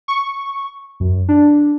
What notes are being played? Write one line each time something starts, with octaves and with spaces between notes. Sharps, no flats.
C#6
F#2
D4